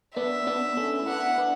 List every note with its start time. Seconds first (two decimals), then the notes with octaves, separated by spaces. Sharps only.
0.16 B3 D4 E5
0.47 B3 D4
0.77 A3 C#4
1.00 E4
1.08 B3 D4 F#5
1.38 B3 D4